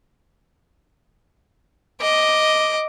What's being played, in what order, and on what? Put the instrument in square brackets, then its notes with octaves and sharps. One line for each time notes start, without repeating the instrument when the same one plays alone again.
[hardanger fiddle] D#5 D6